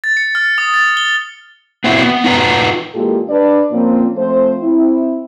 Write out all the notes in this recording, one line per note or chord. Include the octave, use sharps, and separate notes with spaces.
A6
C#7
F6
D#6
A6
G7
B3 C4 E4 F#4
B3
D#4 F4 F#4 B4 G5 A#5
A#2 E3 G#3 F4 G4 A4
D4 B4 D5
A#2 F3 A#3 C4 C#4 F4
F3 A3 C4 C5
C4 E4